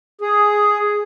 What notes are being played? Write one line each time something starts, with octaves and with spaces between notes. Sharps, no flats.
G#4